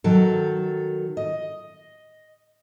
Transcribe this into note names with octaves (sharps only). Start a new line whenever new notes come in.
D#3 F#3 A4
D#5